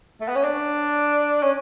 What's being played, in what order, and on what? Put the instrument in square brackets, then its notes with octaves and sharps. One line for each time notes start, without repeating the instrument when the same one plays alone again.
[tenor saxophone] A3
B3
C#4
D4
C#4